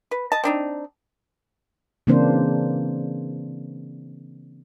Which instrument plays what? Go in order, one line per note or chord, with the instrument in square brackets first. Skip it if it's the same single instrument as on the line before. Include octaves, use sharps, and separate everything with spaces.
[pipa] B4
D#5 A5
C4 D4 D#4
[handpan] C#3 E3 A#3 C4 D4 C5